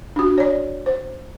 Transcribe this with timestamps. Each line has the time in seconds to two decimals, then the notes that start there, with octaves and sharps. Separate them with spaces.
0.16 D4 F#4
0.38 C#5 D5
0.86 C5